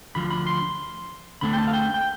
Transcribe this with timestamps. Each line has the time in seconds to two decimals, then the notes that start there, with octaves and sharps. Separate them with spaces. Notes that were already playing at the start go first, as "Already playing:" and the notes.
0.15 D2 D3 F3 B5
0.30 B5
0.46 C6
1.41 D2 D3 A3 C4 B5
1.53 G5
1.58 A5
1.68 F5
1.73 G5
1.94 G5